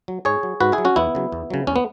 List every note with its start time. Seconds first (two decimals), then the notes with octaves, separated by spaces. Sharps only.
0.08 F#3
0.25 G#2 G#4 C#5
0.43 F#3
0.60 G#2 F#4 B4
0.72 E4 G#4
0.78 F#3
0.85 C#4 F#4
0.96 E2 B3 E4
1.15 C#3 F#3
1.32 E2
1.50 C#3 F#3
1.67 E2 C#4
1.76 B3